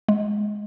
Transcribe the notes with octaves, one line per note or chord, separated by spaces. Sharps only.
G#3